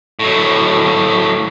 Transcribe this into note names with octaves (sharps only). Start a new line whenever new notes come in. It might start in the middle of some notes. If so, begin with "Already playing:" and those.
A2 F#3